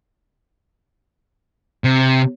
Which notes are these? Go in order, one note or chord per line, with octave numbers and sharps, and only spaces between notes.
C3